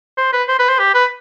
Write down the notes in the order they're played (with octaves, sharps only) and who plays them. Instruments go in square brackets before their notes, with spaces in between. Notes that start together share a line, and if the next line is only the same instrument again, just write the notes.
[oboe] C5
B4
C5
B4
C5
G4
B4